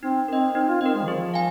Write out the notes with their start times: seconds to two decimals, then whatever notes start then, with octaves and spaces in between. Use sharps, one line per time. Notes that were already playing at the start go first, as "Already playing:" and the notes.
0.03 C4 D#4
0.28 C4 A#4 D#5
0.55 C4 D#4
0.68 F4
0.81 C4 A#4 D#5
0.95 G#3
1.02 D#3
1.07 F3 G#4
1.34 F5 G#5